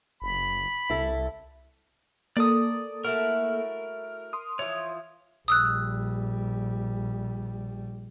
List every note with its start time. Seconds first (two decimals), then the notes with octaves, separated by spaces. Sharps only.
0.22 F#1 B5
0.89 C2 E4 A4
2.37 A#3 A4 D5 D#6
3.04 A3 E4 F#4 A#4
4.33 C6 D#6
4.59 E3 F3 C#5
5.48 A#1 G3 D#6 E6 F#6